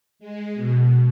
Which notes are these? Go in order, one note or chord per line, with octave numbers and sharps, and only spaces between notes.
G#3
B2